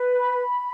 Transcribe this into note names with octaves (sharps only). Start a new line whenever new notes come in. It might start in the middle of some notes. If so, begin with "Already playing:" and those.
Already playing: B4
B5